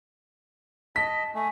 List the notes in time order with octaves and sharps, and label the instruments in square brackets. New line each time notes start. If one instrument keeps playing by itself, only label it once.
[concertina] D#5 [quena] A5 [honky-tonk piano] B6
[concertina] A3 [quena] G#5